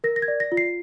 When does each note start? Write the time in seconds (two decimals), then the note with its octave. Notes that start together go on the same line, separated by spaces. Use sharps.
0.04 A#4 A#6
0.16 A#6
0.22 G#6
0.28 D5
0.40 A#6
0.52 F4
0.57 C7